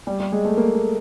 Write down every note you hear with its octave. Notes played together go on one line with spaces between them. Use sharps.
G3
G3
G#3
A3
A#3
A3